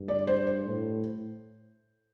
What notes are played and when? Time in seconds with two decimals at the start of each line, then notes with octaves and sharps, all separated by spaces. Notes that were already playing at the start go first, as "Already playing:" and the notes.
Already playing: G2
0.08 D5
0.27 C5
0.47 C5
0.66 A2